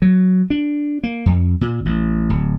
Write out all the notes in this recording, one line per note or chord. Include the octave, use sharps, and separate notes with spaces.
F#3
D4
A#3
F2
A#2
A1
D1